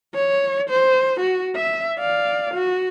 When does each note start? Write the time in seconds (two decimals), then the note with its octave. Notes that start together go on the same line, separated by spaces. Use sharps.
0.15 C#5
0.70 C5
1.20 F#4
1.56 E5
1.99 D5 F5
2.54 F#4